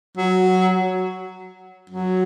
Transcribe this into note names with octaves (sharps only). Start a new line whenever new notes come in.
F#3
F#3